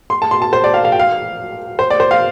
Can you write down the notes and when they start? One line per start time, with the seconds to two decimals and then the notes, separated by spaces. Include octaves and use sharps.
0.10 C6
0.22 A5
0.31 C6
0.42 A5
0.53 C5
0.64 D5
0.74 F5
0.85 F5
0.92 G5
0.99 F5
1.79 C5
1.90 D5
2.00 C5
2.11 F5